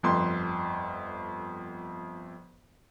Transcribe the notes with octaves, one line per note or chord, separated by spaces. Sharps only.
G1 F2 C6